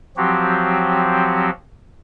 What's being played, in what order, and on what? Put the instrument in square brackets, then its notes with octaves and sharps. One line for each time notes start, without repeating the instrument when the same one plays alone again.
[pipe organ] F3 F#3 C4 F#4 G4